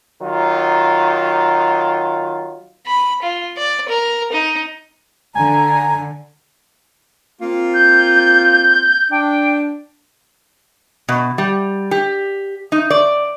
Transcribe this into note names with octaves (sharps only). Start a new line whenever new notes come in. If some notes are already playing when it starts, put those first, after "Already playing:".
D#3 F#3 F4
B5
F4
D5
A#4
D#4
D3 G#5 A#5
A#3 C4 F4
G6
D4 G5
B2
G3
G4
D#4
D5